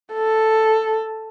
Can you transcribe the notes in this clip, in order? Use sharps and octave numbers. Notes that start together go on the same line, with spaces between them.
A4